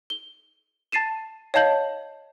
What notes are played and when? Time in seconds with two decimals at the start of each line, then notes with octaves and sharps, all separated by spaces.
0.10 G7
0.92 A5 A6 C7 D#7 E7
1.54 C#5 D#5 F5 A5 G6 F#7